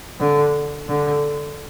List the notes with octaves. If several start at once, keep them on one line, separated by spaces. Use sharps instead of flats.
D3
D3